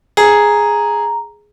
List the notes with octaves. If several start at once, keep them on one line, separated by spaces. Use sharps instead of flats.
G#4 A#5